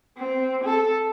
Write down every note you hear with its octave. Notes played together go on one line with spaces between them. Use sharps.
C4
A4